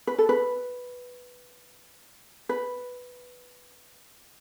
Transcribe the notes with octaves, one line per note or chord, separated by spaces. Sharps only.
B4
A4
B4
B4